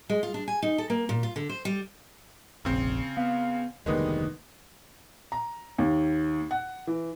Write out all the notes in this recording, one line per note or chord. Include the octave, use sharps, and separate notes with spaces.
G#3
F4
D4
G#5
D#4
A4
A#3
A#2
F4
D3
C5
G3
F1 A#1 C#3 C4
B3 F5
F1 D2 D#3 G3 G#3 A#3 B3
A#5
D#2
F#5
E3